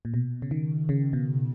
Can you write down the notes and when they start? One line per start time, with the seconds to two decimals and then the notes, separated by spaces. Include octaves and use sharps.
0.05 A#2
0.14 B2
0.42 C#3
0.51 D#3
0.89 C#3
1.13 B2